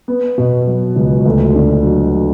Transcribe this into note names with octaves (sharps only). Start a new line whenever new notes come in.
B3
B2
F#3
C#2
D2
D3
F#3